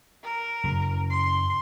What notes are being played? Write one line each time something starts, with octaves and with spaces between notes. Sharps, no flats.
A#4
F#2 C#3 F#3
C6